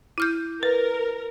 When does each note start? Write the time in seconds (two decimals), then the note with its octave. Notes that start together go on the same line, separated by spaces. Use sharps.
0.18 E4 F6 G6
0.63 A#4 B4